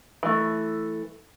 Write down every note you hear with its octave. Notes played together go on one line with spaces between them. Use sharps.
E3 A3